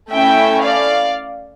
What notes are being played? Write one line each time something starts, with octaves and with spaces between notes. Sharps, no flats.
A3 C#4 E4 E5 G5
D5 F5